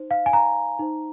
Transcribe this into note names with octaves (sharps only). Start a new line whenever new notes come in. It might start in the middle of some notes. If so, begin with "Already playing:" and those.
Already playing: D#4 C5
F5
G#5
A#5
D#4 C5